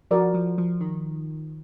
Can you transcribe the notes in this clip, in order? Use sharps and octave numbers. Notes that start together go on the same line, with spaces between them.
F3 F#4 A#4 D5
F3
F3
D#3